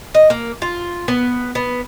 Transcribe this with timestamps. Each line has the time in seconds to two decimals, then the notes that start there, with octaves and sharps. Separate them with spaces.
0.14 D#5
0.30 A#3
0.62 F4
1.08 B3
1.55 B3